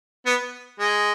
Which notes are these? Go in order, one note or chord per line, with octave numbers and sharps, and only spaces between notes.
B3
G#3